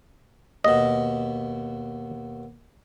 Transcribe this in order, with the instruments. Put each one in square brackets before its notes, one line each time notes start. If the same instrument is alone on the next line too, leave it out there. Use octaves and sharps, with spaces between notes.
[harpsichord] D#2 B2 [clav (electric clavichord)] D#5